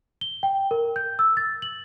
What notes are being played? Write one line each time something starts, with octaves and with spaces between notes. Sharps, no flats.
G7
G5
A#4
G6
E6
A6
F#7